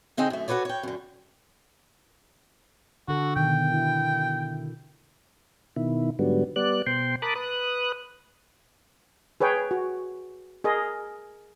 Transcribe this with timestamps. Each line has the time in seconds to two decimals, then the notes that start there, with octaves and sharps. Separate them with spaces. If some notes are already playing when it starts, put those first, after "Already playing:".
0.17 D3 C4 D#4 G#4 G5
0.30 F#2 A3
0.48 F#4 A4 B4 C#5 D5
0.65 C#5 G5
0.83 F#2 D3
3.08 D3 F#4 A4
3.36 B2 D#3 G5
3.72 E4
5.76 B2 D#3 E4
6.19 G#2 D3 F#3 G3 B3
6.56 G3 B3 D5 F#6
6.86 B2 C5 G5 C6
7.22 A#4 A5 B5 D6 D#6 F#6
7.35 B4 D#6 F#6
9.41 G#4 B4 C#5 G5
9.71 F#4
10.64 G#4 A#4 D#5